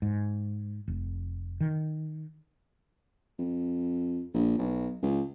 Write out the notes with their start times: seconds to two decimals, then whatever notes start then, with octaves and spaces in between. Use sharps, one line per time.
0.02 G#2
0.88 F1
1.61 D#3
3.39 F2
4.34 A#1
4.58 B1
5.03 C#2